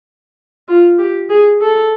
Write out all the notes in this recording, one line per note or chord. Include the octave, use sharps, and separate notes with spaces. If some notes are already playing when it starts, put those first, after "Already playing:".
F4
G4
G#4
A4